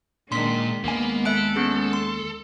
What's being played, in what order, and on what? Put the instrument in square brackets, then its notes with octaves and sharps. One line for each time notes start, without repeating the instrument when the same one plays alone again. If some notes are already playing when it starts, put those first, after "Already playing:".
[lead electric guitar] A#2 [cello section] D#3 G#3 D4 [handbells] C6 B6
[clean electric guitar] D#2 G#5 [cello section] G#3 B3 [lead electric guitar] A#3
[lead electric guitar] A4 [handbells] E5 F#6 D7
[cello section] G#3 [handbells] B3 C#4 G#4
[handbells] C6